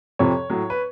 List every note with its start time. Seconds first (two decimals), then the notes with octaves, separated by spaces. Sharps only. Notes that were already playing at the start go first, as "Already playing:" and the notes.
0.19 F2 C3 F3 C#5
0.50 A2 F#3
0.70 B4